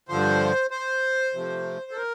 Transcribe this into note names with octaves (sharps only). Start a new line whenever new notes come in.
G2 D3 F3 C5
C5
C3 F3 A3
A4
A#4